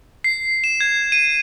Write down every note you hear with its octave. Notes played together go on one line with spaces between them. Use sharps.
C7
E7
G#6
D#7